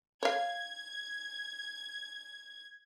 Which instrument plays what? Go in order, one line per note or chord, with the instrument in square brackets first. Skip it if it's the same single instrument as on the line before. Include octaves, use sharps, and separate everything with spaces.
[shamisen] C#5 F5 [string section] G#6